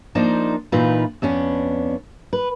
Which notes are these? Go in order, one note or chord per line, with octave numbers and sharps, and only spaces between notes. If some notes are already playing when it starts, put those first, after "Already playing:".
F3 A#3 D4 D#4 C5
A#2 E3 D#4 F4 B4
F2 B3 C#4 D4
B4